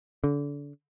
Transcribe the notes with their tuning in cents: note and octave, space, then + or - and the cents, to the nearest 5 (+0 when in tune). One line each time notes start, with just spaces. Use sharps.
D3 -30